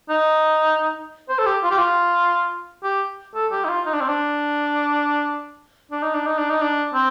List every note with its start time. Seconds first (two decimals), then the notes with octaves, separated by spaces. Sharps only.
0.09 D#4
1.29 C5
1.38 A4
1.46 G4
1.63 F4
1.71 G4
1.78 F4
2.83 G4
3.35 A4
3.51 G4
3.64 D#4
3.69 F4
3.86 D#4
3.93 D4
4.01 C4
4.09 D4
5.91 D4
6.02 D#4
6.14 D4
6.26 D#4
6.38 D4
6.50 D#4
6.61 D4
6.94 C4